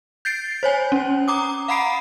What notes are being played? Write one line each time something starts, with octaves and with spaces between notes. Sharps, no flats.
G6 A6 C7 D7
C5 C#5 G#5
C#4
A#5 D6 D#6
F5 F#5 A#5 B5 C7 D7